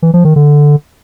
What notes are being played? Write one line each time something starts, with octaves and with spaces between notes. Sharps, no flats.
E3
F3
D#3
D3